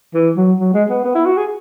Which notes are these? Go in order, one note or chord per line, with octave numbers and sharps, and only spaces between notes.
E3
F#3
F#3
G#3
B3
B3
E4
F#4
G#4